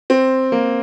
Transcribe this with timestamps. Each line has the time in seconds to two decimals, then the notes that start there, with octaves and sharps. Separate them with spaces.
0.10 C4
0.52 A#3